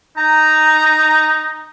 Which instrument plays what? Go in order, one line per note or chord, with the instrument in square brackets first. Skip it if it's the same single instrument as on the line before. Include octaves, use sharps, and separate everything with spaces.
[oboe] D#4 [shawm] A#5